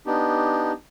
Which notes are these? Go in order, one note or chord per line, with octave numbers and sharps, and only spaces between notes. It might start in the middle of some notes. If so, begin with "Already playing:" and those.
B3 D4 D#4 G4